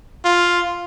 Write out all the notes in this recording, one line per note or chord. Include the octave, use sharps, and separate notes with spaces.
F4